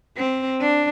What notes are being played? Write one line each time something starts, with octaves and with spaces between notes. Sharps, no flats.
C4
D4